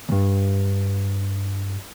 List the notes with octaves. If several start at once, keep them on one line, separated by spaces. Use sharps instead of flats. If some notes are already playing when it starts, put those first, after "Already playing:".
D2 G2